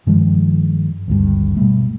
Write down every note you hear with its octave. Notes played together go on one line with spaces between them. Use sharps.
G2 D#3 F3 G#3
G#1 D2 G2
B2 G3 A3